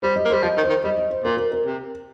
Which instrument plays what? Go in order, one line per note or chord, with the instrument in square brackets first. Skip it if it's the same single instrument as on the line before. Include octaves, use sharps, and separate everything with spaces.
[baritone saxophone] G3 [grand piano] C5
[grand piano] D#5
[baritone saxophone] A#3
[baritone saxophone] G3 [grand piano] C5
[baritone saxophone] F3 [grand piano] D#5
[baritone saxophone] D#3
[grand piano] C5
[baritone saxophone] D#3
[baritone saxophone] G3 [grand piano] D#5
[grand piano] D#5
C5
[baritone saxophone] A#2 [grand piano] A#4
[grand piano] A#4
A#4
[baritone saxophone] C3